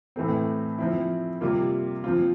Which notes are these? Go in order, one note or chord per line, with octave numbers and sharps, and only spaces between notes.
A2 E3 A3 C4
F3 C4 E4
C3 G3 A#3 F4
F3 C4 F4